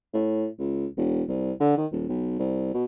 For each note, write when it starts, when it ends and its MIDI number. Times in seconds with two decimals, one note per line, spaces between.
0.14 0.47 45
0.59 0.86 37
0.97 1.23 28
1.28 1.52 36
1.60 1.74 50
1.77 1.86 51
1.92 2.06 27
2.09 2.39 35
2.39 2.70 36
2.74 2.84 47